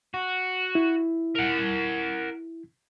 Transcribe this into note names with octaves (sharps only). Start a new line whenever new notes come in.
F#4
E4
A#4 F#5